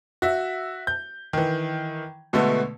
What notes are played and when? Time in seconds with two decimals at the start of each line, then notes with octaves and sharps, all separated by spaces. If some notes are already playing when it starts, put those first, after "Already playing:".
0.22 F#4 E5
0.87 G6
1.33 D#3 E3
2.33 B2 D3 G#3 A3 B3